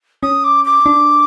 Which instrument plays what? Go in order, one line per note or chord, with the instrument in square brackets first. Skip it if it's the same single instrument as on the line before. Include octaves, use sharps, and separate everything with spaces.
[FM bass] C#4 [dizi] D#6
[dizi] D6
D6
[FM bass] D4